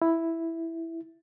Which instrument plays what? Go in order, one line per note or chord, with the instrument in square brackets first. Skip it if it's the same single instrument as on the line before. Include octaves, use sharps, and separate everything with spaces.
[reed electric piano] E4